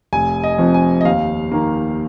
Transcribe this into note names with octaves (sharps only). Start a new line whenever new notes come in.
F1 G#5
D#5
F2 F3
G#5
D#5
D#2 F5
D#3 A#3